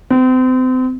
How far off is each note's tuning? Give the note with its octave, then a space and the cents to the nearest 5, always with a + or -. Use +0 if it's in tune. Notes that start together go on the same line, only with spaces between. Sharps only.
C4 -35